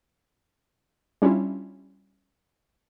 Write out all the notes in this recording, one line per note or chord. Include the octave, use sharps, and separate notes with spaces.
G3 C#4 D4 E4 F4